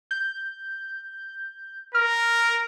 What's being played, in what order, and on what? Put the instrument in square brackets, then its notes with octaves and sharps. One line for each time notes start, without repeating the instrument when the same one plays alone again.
[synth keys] G6
[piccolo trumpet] A#4 [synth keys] F6